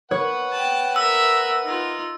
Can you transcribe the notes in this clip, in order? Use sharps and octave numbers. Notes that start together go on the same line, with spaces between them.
B4 C#5 F#5
G5 A5
A#4 E5 E6
D#4 F4